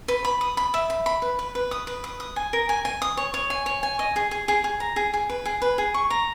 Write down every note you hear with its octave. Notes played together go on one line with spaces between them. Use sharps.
B4
B5
D#6
B5
E5
B5
B5
B4
B4
B4
D#6
B4
D#6
D#6
G#5
A#4
G#5
G#5
D#6
C#5
C#5
G#5
C#5
G#5
D#5
G#4
G#4
G#4
G#4
A#5
G#4
G#4
B4
G#4
B4
G#4
C#6
A#5